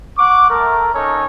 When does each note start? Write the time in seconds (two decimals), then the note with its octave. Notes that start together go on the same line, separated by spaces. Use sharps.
0.17 F#5 C#6 D6
0.48 A3 A#4
0.93 C#4 D#4 A4 C#5